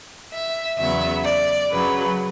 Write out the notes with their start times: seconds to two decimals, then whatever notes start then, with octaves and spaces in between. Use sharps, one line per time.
0.32 E5
0.78 E2 C#3 F#3 B3 E5
1.24 D5
1.69 F#2 C#3 F#3 B4